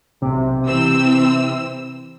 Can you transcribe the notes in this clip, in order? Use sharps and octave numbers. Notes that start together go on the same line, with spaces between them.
B1 C3
E3 C4 E6